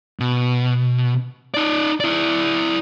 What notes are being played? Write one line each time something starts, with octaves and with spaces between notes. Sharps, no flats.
B2
D#4 D5
E4 D5